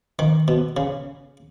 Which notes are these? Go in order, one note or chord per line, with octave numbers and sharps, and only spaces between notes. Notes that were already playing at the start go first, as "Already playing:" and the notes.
D#3
B2
C#3